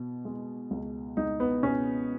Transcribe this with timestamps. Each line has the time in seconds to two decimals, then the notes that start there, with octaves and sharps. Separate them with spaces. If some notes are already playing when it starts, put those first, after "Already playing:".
Already playing: B2
0.25 G#3
0.71 C#2
1.17 C#2 D#4
1.40 B3
1.63 B2 C#4